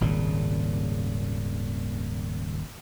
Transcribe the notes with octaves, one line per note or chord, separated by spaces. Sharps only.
D#1 G#1 A#2 C#3